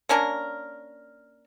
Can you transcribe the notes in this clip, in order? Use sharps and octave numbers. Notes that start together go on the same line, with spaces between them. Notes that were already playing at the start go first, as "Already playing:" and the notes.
A#3 C#4 D4 A#4